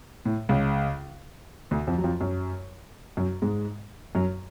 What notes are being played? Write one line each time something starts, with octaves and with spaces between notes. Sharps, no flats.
A2
C#2 C#3
D2 D3
F2 F3
F#3
F2 F3
F#2 F#3
F#2 F#3
G#2 G#3
F#2 F#3